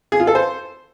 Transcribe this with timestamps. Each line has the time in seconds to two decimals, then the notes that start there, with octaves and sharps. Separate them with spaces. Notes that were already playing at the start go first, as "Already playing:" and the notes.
0.12 G#4
0.20 F4
0.27 A4
0.35 C5